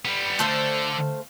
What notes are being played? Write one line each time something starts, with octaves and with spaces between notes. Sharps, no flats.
G3 B3
D3 A3 A4 C5 F5